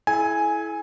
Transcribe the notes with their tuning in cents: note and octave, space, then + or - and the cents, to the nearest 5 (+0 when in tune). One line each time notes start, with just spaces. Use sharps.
E4 +0 A4 -45 G#5 +0